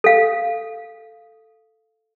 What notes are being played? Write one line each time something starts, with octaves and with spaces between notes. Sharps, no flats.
A4 F5